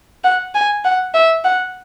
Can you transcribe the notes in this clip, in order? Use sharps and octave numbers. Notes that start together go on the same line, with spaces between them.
F#5
G#5
F#5
E5
F#5